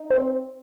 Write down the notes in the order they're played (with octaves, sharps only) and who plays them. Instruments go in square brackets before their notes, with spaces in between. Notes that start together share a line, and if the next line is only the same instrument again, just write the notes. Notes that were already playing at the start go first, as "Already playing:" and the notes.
Already playing: [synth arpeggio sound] D#4
C4